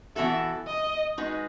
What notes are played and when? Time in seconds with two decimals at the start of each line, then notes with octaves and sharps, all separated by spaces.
0.16 E3 B3 F#4 A4 E5
0.67 D#5
1.18 G#3 D#4 F#4 B4